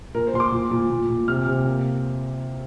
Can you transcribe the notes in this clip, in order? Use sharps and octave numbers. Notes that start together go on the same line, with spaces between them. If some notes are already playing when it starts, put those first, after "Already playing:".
A#2 A#4
C5
A#2 C6
D6
A#2
A#2
A#2
A#2
C3 F6
C3
A#3